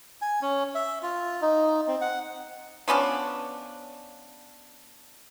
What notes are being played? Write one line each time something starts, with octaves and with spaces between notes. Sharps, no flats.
G#5
C#4
E5
F4
D#4
C4
F#5
F3 B3 C#4 D4